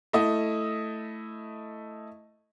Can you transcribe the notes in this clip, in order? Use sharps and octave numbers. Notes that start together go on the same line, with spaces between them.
A3 E4 D#5